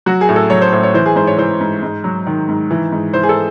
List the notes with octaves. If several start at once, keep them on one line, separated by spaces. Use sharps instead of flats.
F#3 F#4
G#4
A2
A4
F#3 C#5
C5
A2 C5
C#5
E3 C5
G#4
G#2 C5
C#5
E3 C5
G#2
G#2
F#3
D#3
G#2
E3
G#2
E3 C5
G#4
A4